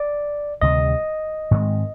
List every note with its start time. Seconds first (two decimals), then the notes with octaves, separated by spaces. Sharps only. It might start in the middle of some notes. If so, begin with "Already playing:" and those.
Already playing: D5
0.61 D2 C3 D#3 G3 D#5
1.51 G#2 D#3 G#3 C4